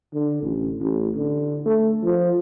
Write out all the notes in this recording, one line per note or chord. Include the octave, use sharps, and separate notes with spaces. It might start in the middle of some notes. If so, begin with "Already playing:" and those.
D3
A1
A1
D3
A3
F3